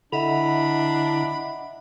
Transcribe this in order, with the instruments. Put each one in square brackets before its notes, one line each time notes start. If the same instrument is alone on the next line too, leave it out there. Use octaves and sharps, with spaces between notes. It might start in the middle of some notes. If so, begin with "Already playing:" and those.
[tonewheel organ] D3 E4 A#5 [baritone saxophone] D4 [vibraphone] D#5 E5 F#5 [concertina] B5